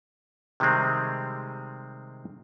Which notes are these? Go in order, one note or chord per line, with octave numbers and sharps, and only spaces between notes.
C3 D#3 G3 G#3 C4